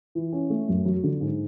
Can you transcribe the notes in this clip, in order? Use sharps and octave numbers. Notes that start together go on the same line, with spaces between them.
E3
C#4
A3
F#2
F#3
D3
G#2